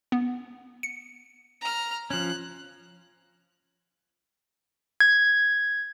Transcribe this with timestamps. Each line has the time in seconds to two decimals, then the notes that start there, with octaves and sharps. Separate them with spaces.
0.12 B3
0.83 C#7
1.61 A#5 F6
2.10 F3 C#4 F#6
5.00 G#6